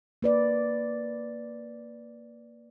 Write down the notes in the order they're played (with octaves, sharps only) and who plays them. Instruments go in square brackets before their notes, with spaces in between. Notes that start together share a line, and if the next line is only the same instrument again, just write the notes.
[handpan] A#3 B4 D5